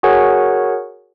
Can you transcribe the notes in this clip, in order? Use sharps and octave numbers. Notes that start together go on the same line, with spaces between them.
F#4 G#4 A#4 C#5 F#5 G#5